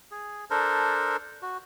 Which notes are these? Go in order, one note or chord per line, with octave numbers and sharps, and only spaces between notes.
G#4
D4 A4 A#4 C5
F#4